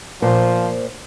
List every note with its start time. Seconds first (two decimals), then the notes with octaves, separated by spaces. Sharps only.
0.22 A#2 F3 C5